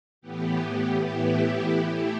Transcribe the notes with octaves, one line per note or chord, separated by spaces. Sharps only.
A2 E3 B3 G4
A2 E3 B3 E4 G4
E3 A3 E4 G4